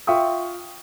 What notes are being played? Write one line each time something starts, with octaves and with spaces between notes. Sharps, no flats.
F4 E5 F5 G5 C#6 D#6